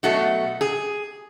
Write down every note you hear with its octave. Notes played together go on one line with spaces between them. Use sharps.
B2 F#3 A3 F#4
G#4